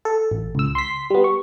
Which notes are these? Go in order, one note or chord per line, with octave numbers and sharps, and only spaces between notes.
A4
A1
C#2 E6
C6 B6
G3 B3
C#6